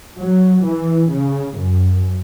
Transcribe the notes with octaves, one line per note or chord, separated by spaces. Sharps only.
F#3
E3
C#3
F#2